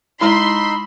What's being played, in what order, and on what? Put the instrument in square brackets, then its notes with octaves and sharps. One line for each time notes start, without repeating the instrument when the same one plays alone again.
[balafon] G#3 E4 [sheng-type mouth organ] D#4 E6 [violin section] B5 C6